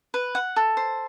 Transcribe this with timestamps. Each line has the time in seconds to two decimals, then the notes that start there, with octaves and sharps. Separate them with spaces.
0.14 B4
0.35 F#5
0.56 A4
0.77 C5